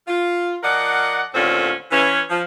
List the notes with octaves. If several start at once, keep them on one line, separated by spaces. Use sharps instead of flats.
F4
F3 A#4 D5 D#5 F#5
D#2 A2 D3 C4 C#4 F4
E3 C#4
F3